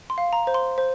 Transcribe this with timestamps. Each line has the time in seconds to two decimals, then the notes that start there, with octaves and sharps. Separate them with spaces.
0.10 C6
0.18 F5
0.33 A#5
0.47 C5
0.54 C6
0.78 C5